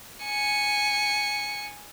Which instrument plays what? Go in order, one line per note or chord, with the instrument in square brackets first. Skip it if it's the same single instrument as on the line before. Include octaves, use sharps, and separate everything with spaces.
[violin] G#5 C#7